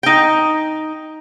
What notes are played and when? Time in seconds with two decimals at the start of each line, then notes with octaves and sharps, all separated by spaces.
0.03 D#4 G5